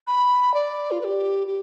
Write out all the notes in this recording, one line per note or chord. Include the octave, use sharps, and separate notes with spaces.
B5
D5
F4
B4
G4
G4